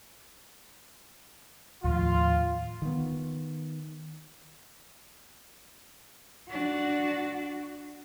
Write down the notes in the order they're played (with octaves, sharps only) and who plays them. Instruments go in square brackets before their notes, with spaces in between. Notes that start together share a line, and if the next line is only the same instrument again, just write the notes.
[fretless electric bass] D#2 A2 F3 [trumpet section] F4
[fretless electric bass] D#3 B3
[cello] D4 F#4